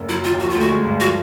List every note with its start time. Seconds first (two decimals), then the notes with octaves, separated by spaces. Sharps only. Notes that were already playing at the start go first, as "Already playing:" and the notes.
Already playing: F#1
0.09 F#3 E4
0.24 D#2 F4
0.39 F3 F#4
0.50 F4
0.55 D2
0.60 F#4
0.70 G#3
0.85 G2
1.00 F3 F#4